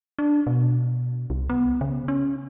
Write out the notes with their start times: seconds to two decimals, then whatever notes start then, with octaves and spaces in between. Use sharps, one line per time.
0.19 D4
0.47 B2
1.30 C2
1.50 B3
1.81 C#3
2.08 C#4